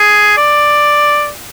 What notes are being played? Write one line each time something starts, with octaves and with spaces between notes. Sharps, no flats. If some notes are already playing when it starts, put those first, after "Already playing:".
Already playing: G#4
D5